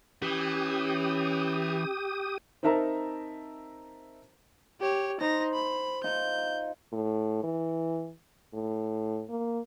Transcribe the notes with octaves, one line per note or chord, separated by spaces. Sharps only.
E3 C#4 G4 D#6
C4 D#4 A#4 E5 A5 A#5
G4 C#5
D#4 C5 A#6
B5
D#4 F4 G6
A2
E3
A2
A#3